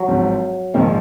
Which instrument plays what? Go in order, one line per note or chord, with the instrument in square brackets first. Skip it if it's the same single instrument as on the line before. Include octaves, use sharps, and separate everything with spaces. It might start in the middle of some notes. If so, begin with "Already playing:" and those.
Already playing: [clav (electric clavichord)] F#3
[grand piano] G#1 G#2 F3
[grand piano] A#1 G#2 F3 A#3 [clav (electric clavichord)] D#3